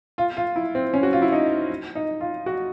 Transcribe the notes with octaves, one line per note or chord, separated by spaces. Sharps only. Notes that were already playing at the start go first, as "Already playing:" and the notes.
F4
F4
E4
C4
C#4
F#4
F4
E4
D#4
D#4
F4
F#4